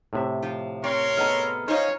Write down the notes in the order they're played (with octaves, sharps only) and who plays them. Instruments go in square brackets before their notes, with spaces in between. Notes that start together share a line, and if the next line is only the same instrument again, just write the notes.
[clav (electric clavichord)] A2 C3 E5
[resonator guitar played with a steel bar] F3
[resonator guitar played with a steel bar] C4 [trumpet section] A#4 C#5 C6
[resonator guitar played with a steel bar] G#3 B3 A4 [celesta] A#5 F6
[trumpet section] C#4 C#5 [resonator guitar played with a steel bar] D#4 F4 [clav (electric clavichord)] C5 D#5